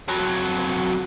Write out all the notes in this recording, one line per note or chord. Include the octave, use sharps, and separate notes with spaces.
F2 F#3